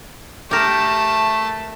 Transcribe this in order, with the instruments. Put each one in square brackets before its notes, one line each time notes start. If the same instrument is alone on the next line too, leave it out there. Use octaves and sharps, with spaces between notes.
[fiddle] A3 A5 [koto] G4 A#4